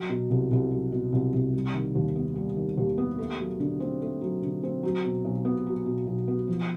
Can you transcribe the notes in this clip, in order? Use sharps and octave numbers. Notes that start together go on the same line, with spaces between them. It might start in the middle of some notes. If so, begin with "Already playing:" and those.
Already playing: F#3
B2
C2
C2
F#3
B2
C2
C2
G3
D#3
D#2
B3
G3
D#3
D#2
B3
A3
F#3
D3
C4
A3
F#3
D3
C4
F#3
B2
B1
B3
F#3
B2
B1
B3
F3